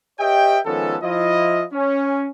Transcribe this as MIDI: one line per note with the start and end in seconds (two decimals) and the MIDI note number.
0.20 0.59 67
0.20 0.59 71
0.20 0.59 73
0.20 0.59 75
0.20 0.59 76
0.20 0.59 79
0.66 0.97 51
0.66 0.97 53
0.66 0.97 56
0.66 0.97 59
0.66 0.97 61
0.66 0.97 69
1.03 1.64 53
1.03 1.64 64
1.03 1.64 65
1.03 1.64 75
1.73 2.29 61